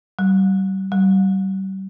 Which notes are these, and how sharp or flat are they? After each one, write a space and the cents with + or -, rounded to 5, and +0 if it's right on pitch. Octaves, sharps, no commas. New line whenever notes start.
G3 -35
G3 -35